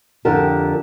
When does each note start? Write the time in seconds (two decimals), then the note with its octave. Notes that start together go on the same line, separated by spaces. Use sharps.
0.25 F2 D3 G4 A#4 A5